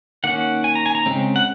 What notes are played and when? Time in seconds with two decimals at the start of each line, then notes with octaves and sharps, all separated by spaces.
0.24 D#3 A#3 C#4 F#5
0.64 G#5
0.75 A#5
0.86 G#5
0.95 A#5
1.06 C#3 G#3 C4
1.36 F#5